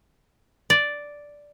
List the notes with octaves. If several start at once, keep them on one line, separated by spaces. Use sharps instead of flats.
D5